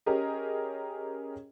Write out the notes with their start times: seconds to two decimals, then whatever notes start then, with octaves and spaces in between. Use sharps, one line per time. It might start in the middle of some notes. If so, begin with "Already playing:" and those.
0.06 C#4 G4 G#4 A#4 D#5